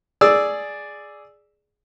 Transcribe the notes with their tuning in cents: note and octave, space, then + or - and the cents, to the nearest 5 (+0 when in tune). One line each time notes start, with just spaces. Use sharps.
G#4 +5 D5 +0 E6 +0